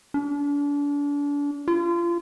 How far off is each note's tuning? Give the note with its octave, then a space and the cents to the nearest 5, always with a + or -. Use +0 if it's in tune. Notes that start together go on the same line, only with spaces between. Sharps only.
D4 -35
F4 -30